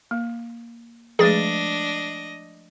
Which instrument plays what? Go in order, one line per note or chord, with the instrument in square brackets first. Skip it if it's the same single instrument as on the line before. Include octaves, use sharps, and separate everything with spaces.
[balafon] A#3
[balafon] F3 G#3 A3 [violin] D4 D#5 [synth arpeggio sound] G#4 A6